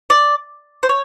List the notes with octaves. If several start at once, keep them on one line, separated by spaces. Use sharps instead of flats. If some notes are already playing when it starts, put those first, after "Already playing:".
D5
C5
C#5